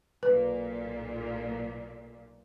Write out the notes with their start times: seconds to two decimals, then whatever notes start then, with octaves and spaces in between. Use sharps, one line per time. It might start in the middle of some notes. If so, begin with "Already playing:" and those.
0.23 B1 A#2 B4